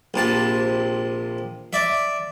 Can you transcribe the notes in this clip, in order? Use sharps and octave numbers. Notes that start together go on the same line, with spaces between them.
A#1 C3 A5
D5 E5